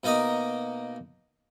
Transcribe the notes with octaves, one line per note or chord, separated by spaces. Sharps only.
B2 A#3 D#4 D#5